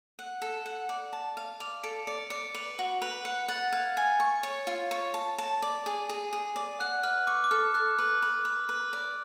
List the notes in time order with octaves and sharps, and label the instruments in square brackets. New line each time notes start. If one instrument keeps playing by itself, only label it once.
[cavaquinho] F#5
A4
F#5
D5
A5
F5
[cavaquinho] D5 [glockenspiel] F7
[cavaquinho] A4 [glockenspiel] D7
[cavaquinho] D5 [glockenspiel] C#7
[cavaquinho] D5 [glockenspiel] C#7
[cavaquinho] B4 [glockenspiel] F7
[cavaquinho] F#4 [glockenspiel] F#7
[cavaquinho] B4 [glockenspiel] F7
[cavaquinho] F#5 [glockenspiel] C#7
[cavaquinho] F#5 [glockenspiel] A6
[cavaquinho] F5 [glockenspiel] G#6
[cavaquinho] G#5
C#6
C#5
F4
C#5
A5
A5
D5
G#4
G#4
G#4
D5
[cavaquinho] F#5 [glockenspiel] F#6
[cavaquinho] B4 [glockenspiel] F6
[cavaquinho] C#6 [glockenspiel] D6
[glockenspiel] D6
[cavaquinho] A4 [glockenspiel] F6
[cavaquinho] A4 [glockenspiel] F#6
[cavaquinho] B4
B4
B4
B4
D5